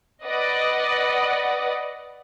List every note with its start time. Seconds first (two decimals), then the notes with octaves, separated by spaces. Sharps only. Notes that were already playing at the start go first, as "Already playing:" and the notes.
0.25 B4 D5 D#5 F#5